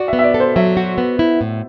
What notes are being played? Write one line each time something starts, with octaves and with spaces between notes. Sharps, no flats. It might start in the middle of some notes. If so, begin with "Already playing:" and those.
Already playing: F#4 D5
E5
B3
E5
D5
A4
C5
F#3 E5
F#4
B3
E4
A2